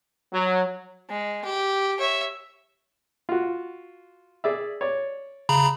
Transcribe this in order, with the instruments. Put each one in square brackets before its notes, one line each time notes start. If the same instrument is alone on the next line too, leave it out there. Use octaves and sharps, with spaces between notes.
[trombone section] F#3
[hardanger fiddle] G#3
G4
C#5 E5
[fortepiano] F4 F#4
G#4 D5 E5
C#5 D5
[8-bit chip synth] C#3 A#5 B5